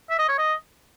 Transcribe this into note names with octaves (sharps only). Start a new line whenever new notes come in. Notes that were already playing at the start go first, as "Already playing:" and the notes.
E5
D#5
C#5
D#5